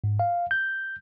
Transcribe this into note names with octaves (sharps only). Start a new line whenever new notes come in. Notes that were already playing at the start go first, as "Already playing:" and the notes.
G#2
F5
G6